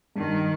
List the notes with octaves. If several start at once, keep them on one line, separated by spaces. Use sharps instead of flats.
G2 D#3